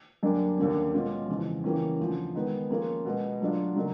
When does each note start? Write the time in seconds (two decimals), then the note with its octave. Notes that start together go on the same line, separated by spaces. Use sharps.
0.23 F#2 D3 G3 A#3 D4
0.58 D#2 D3 G3 A#3 C#4
0.93 B2 G#3 C#4 F4
1.29 F2 C#3 E3 G#3
1.64 C#3 E3 G3 A#3 C#4
1.99 D2 C#3 F3
2.34 D#3 G#3 B3 D#4
2.70 F3 A#3 C#4 F4 G#4
3.05 B2 G#3 B3
3.40 D3 F#3 A3 D4 F4
3.76 C#3 F#3 A#3 D#4